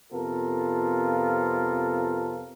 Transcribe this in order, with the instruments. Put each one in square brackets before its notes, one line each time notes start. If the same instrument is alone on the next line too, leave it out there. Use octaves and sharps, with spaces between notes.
[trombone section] F2 C3 B3 F4 A4 A#4